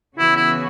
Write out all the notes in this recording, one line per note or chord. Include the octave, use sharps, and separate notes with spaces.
C#3 E3 B3 E4 F#4
E4